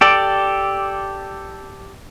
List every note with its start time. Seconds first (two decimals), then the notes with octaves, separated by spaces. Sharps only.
0.01 G4 A4 D5